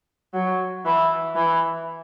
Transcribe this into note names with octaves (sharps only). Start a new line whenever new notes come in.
F#3
E3
E3